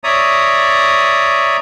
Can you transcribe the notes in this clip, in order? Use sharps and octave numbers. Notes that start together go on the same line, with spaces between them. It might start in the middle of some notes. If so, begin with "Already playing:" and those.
C#5 D5 E5 A#5 D#6